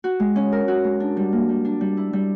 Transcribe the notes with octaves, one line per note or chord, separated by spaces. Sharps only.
F#4
G#3
C#4
A#4
F#4
G#3
D4
G3
A#3
G3
D4
G3
E4
G3